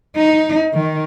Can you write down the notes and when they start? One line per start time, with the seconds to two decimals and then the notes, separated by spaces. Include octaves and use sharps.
0.16 D#4
0.73 D#3